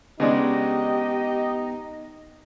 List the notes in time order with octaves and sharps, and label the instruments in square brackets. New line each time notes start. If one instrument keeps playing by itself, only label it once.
[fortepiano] C#3 G#3 D4 [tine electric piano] B3 [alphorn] D#4 [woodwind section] G4 D#5